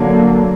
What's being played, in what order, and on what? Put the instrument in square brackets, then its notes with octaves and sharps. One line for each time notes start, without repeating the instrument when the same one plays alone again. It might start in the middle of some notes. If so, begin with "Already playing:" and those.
Already playing: [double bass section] D3 F#3 A#3